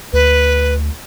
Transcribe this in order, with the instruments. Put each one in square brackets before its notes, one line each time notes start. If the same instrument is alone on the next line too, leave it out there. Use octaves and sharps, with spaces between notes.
[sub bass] D2 [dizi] B4